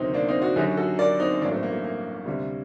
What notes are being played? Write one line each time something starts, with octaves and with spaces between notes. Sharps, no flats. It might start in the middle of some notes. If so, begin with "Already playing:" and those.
Already playing: D2 C3 D#3 F#3 C4 D#4
A#3 D4
C4 D#4
D4 F#4
F#2 D3 F#3 D#4 G4
F#4 A4
A#4 D5
C4 D#4
A1 G2 F#3 A#3 D4
A3 C4
A#3
A3
A#3
D2 C3 G3